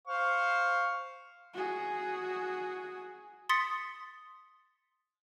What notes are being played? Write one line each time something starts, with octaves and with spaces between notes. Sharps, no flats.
C5 F5 C#6
F#4 G#4
C6 D#6 A6 B6 C#7